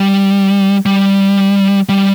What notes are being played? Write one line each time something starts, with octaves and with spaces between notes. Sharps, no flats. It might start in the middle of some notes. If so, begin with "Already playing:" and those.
Already playing: G3
G3
G3